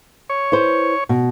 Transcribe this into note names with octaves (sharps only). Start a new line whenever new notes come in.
C#5
E4 B4 C5
B2